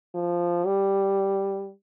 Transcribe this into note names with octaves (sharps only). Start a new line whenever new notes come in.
F3
G3